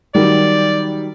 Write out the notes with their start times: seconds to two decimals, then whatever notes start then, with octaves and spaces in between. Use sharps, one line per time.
0.15 D#3 F#3 G3 D5